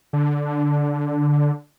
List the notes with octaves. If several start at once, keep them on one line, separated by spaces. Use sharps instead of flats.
D3